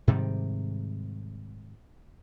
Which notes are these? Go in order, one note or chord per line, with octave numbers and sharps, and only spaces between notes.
G#2 C3 D#3 G3